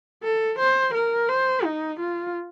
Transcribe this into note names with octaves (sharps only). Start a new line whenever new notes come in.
A4
C5
A#4
C5
D#4
F4